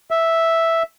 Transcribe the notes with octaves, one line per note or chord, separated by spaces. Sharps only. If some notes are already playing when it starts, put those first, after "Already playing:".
E5